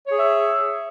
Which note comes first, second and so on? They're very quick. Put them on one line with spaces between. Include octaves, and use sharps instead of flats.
C#5 G#4 E5